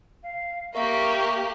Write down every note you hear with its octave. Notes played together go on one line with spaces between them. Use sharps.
F5
A#3 G4 A#4 E5 F5 C#6